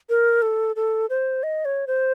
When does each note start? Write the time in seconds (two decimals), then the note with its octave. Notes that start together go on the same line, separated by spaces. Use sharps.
0.09 A#4
0.42 A4
0.76 A4
1.10 C5
1.43 D#5
1.65 C#5
1.87 C5